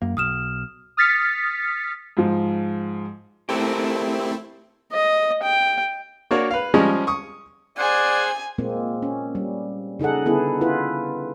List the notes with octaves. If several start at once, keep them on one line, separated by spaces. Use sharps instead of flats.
F#2 A#3
B1 D#6 F6 E7
D#6 F6 A6 B6 C#7
G#2 F3
A3 C4 E4 G4 A4 A#4
D#5
G5
A#3 D4 F#4 A#4 C#5
B4 F5
F3 G3 G#3 C#4 D#5
C#6 D#6
G#4 C5 D5 F#5 G#5
A#2 G#3 A#3 C4
C#4
G3
C#3 D#4 G#4 A4 F#5
D3 B3 E4 G#4 A4
E4 F4 B4